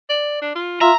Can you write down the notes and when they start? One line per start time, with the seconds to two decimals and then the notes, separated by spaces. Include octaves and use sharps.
0.09 D5
0.42 D4
0.55 F4
0.81 F4 E5 A#5